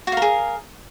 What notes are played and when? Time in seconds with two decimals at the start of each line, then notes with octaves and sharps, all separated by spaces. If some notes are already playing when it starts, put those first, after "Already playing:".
0.07 F#4
0.12 F5
0.17 A#4
0.22 G#4